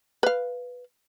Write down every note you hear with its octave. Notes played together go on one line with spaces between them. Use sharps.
B4 F5